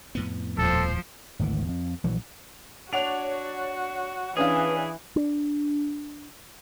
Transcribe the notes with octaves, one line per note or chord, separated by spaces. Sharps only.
F2 A2 B3
D#1 F3 A4 C5
G#1 D2 C#3 E3
F2
A#1 E3 F#3
D4 F#4 C#5 F#5 F7
E3 C#4 D4 G#4 B4 F5
D4